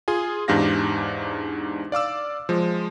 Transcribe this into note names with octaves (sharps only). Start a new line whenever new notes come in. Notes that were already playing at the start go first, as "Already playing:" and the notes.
F4 G#4 G#5
E2 G#2 D4 G4 F5 A#6
D5 F5 D6 E6
F3 G#3